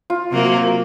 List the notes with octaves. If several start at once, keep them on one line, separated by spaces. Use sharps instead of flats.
F4
C3 F#3 A#3